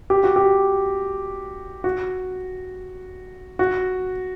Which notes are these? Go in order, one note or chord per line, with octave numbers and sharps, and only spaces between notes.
G4
F#4
G4
F#4
F#4